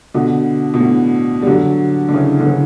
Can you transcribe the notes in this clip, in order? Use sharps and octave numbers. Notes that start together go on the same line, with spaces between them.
B2 D3
B2
A2
G3
D3 F#3
D3
C#3 E3
D3
C#3 E3